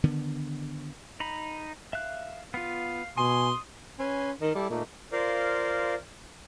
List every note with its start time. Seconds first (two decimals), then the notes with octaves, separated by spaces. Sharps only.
0.04 D3 D#3 B3
1.20 D#4 A#5 B5
1.93 E5 F5 F#6
2.54 B3 F4 F5
3.18 B2 G#5 C6 D#6
3.99 C#4 B4 G#5 C6
4.41 D#3 A#4 D#5
4.55 G3 E4 A4 D5
4.70 A#2 A3 A#3 D#4
5.12 F4 A#4 C5 D5 F5